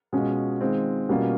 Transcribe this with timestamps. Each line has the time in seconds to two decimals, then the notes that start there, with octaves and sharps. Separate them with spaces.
0.13 B2 G#3 C#4 F4
0.61 D#3 G#3 C4 F4
1.09 B2 G3 A#3 C#4 F4